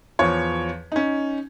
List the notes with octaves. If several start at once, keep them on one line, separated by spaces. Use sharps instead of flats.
E2 F3 C#5
C#4 D#4